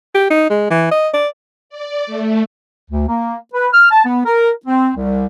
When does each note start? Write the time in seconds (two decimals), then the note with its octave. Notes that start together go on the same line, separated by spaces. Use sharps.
0.15 G4
0.30 D#4
0.50 G#3
0.70 E3
0.91 D#5
1.14 D5
1.70 D5
2.06 A3
2.89 D2
3.07 A#3
3.53 B4
3.73 F6
3.91 A5
4.05 B3
4.25 A#4
4.66 C4
4.95 C2